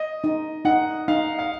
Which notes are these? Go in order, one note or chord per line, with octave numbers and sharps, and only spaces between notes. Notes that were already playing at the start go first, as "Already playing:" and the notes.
Already playing: D#5
D#4
D#4 F#5
D#4 F5
F5